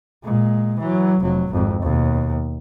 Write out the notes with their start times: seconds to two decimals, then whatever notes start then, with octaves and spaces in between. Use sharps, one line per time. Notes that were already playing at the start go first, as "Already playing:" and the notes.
0.24 A#2 G#3
0.80 E3 F#3
1.20 F1 F#3
1.51 G#1 F2
1.83 D#2 B2